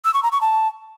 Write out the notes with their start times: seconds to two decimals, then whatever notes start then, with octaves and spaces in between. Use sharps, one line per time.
0.05 E6
0.14 C#6
0.23 A#5
0.32 C#6
0.41 A5